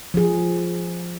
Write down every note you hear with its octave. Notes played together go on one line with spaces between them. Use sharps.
F3 G#4